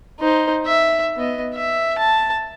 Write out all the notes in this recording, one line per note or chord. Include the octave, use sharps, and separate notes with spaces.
D#4 C5
E5
B3 D#5
E5
A5